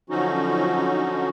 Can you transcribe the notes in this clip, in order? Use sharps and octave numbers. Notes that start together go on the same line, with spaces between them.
D3 F3 F#3 C#4 D#4 F#4